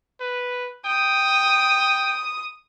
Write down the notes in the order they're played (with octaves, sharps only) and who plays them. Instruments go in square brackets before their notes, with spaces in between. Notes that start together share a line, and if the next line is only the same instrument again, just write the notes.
[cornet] B4
[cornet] G5 [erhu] D#6